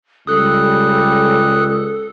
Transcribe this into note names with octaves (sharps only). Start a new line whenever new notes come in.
C#2 G3 A4 D#6 F#6